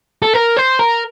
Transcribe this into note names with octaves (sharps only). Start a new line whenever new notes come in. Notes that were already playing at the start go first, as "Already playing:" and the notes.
A4
A#4
C5
A#4